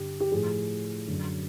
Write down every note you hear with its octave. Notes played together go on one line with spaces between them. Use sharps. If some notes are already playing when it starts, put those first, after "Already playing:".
Already playing: G2 D3 G3 G4
G4
A2 F3 G#4
F#2 D3 F#3